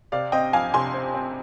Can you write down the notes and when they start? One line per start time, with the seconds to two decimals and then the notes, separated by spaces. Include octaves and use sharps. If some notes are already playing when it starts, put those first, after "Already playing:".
0.12 C3 D5 F5
0.32 C4 D#5 G5
0.53 F2 F5 G#5
0.74 C3 G#5 C6
0.94 C4
1.14 C4